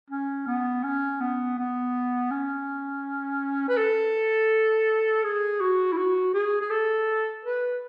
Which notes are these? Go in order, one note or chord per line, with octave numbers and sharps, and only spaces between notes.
C#4
B3
C#4
B3
B3
C#4
B4
A4
G#4
F#4
E4
F#4
G#4
G#4
A4
B4